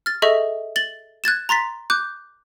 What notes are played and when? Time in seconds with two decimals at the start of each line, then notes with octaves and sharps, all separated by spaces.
0.06 F6 A6
0.22 G#4 A4 D#5 E5 C#6
0.76 A6 F#7 G7
1.24 F#6 G#6 A6 E7
1.49 A#5 C6 A6 B6
1.90 D6 F#6 G6